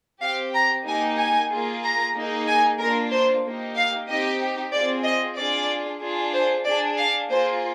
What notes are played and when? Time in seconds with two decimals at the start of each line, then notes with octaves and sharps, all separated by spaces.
0.21 C4 G4 F5
0.54 A#5
0.86 A#3 D#4 G4 G#5
1.18 G#5
1.50 A#3 F4 G#4
1.82 A#5
2.15 A#3 D#4 G#4
2.47 G#5
2.79 A#3 D4 F4 A#4
3.11 C5
3.43 A#3 D#4 G4
3.76 F5
4.08 C4 D#4 G4 D#5
4.72 C4 F4 G#4 D5
5.04 D#5
5.36 D4 F4 G#4 D5
6.01 D4 F4 G#4
6.32 C5
6.65 D4 G#4 D5
6.96 F5
7.29 A#3 F4 G#4 C5